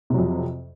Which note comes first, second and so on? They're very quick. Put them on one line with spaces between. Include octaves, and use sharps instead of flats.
C3 F#3 F2